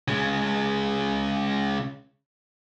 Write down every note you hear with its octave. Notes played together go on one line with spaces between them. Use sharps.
C#3 G#3